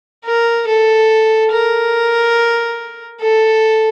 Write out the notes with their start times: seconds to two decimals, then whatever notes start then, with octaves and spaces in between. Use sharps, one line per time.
0.25 A#4
0.67 A4
1.52 A#4
3.21 A4